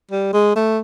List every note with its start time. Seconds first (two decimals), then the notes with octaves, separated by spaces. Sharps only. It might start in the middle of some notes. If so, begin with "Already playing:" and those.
0.11 G3
0.33 G#3
0.56 A3